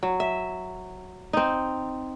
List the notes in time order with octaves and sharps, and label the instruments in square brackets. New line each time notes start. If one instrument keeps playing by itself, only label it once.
[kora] F#3
E5
C4 D#4